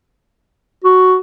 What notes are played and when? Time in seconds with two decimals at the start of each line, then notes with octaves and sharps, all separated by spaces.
0.84 F#4